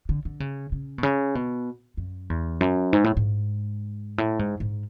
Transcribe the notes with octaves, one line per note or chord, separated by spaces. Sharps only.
D3
D3
C#3
C#3
B2
C#3
B2
F#2
E2
F#2
G#2
A2
G#2
A2
G#2
G#2